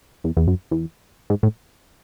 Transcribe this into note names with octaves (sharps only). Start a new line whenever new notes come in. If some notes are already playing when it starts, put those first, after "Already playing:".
E2
E2
F#2
E2
G#2
A2